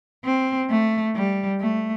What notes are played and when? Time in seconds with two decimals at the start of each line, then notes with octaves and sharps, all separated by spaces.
0.24 C4
0.70 A3
1.15 G3
1.60 A3